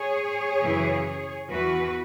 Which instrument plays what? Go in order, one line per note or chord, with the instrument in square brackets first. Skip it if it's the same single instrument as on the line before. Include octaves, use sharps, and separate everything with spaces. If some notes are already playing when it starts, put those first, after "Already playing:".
Already playing: [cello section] G#4 C#5
F#2 C#3 E3
E2 E3 F#4 B4